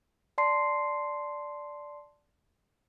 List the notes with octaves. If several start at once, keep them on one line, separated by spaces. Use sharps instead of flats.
D5 A5 C6 C7